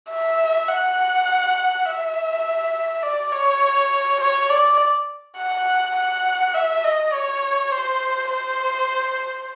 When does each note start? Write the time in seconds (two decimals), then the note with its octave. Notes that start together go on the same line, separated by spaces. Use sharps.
0.10 E5
0.68 F#5
1.85 E5
3.03 D5
3.32 C#5
4.21 C#5
4.49 D5
5.37 F#5
5.96 F#5
6.54 E5
6.84 D#5
7.13 C#5
7.72 C5
8.30 C5